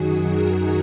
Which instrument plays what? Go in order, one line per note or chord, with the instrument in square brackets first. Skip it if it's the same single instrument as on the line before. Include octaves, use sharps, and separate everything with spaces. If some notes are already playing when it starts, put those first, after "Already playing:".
Already playing: [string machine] F#2 D#3 F#3 F#4 G#4
A#4